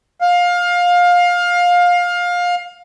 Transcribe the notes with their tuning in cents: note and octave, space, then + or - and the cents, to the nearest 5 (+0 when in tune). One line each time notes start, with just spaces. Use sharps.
F5 +20